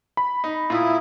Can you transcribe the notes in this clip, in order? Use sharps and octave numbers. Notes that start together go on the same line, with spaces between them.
B5
D#4
A#2 E4 E5 F5 D#6